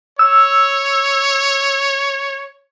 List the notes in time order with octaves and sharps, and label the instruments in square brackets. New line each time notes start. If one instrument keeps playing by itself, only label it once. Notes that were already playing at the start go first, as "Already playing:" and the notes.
[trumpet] C#5 [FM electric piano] E6